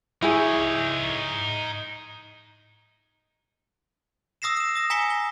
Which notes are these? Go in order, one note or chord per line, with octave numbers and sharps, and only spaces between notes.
D#4 E4 G#4 C#5
D#6 E6 A#6 C7 E7
D#6 E7
D#6 A#6 E7
G#5 A#5 D#6 B6 C#7 G7
G7